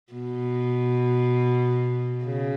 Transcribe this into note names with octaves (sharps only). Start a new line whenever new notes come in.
B2
C#3